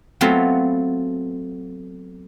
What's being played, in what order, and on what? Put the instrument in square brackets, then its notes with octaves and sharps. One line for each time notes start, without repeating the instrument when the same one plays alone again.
[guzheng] F#3 A3 B3 C4 F4